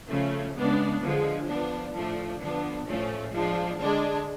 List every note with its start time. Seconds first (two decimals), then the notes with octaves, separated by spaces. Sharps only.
0.09 C#3 F3 A3 C#4
0.56 C#3 G#3 B3 D4
1.01 D3 F3 G#3
1.47 F3 B3 D4
1.94 A2 F3 A3 D4
2.41 D3 F3 B3 D4
2.88 A2 F3 A3 C#4
3.33 F3 G#3 D4
3.80 D3 G#3 D4